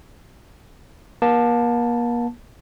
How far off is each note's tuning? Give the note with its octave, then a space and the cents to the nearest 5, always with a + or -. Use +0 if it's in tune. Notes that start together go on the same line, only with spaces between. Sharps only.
A#3 +40 A5 +0